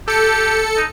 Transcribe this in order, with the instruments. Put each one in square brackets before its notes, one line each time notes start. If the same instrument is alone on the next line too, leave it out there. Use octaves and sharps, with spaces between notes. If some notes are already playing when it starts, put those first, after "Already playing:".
[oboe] G4 [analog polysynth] A4 C#7
[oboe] D#4